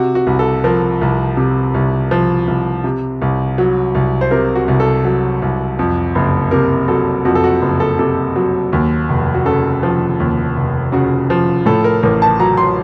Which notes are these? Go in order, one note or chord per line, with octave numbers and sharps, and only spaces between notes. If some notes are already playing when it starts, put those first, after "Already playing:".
Already playing: C3 F#4
F#4
C2
A4
F3 A#4
C2
C3
C2
F3
C2
C3
C2
F#3
C2
C5
C3 A#4
F#4
C2
A4
F#3
C2
F2
F#1
C3 A#4
F#3 A4
F2 F#4
A4
F#4
F#1
A4
C3 A4
F#3
D#2
F1
F#4
C#3 A4
F3
D#2
F1
C#3 F#4
F3
A2 A4
A#4
A1 A#4
A5
F#3 A#5
C6